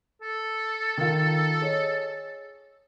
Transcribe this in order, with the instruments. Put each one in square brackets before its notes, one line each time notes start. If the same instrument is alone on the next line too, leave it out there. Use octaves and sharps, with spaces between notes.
[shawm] A4
[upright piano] D#3 F4
G#4 C#5 D#5